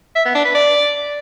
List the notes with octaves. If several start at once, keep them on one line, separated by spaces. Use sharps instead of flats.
E5
B3
D4
B4
D5